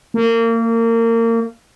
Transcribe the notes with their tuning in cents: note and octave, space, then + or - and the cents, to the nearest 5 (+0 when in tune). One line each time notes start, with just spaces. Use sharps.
A#3 -30